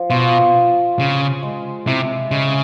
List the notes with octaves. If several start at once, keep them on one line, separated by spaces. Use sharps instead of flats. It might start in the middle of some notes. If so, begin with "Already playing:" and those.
Already playing: F3
B2 F4
F4
C#3 G#4
G#3
C3 E4
C#3 G#3